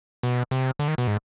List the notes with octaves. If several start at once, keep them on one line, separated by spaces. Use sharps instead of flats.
B2
C3
D3
D#3
B2
G#2